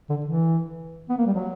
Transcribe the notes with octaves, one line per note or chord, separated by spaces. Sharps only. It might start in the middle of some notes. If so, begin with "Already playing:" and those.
D3
E3
B3
A#3
G3
F#3